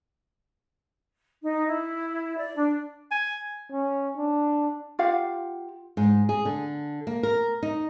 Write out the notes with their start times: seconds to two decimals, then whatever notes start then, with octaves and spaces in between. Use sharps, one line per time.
1.42 D#4
1.67 E4
2.37 D5
2.55 D4
3.11 G#5
3.71 C#4
4.17 D4
4.99 F4 G4 F5 F#5
5.97 G#2
6.29 G#4
6.45 D3
7.07 A#3
7.23 A#4
7.63 D#4